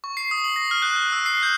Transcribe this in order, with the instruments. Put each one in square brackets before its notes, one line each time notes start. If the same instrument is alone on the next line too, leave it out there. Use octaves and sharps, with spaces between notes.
[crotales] C#6
C7
D#6
F#7
A#6
F6
F#6
F6
E6
C7
G6